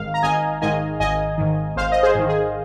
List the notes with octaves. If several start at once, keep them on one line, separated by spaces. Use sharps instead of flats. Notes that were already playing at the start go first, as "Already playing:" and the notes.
Already playing: G#1 G#2 D#3 F5
A#5
G#1 D#5 G#5
G#2 D#3 D#5 G#5
G#1 D#5 G#5
G#2 D#3
G#1 C5 F5
D#5
G#4 C5
G#2 D#3
G#4